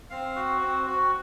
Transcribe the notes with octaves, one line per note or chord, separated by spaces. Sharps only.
C4 F5
F#4
C4
F#4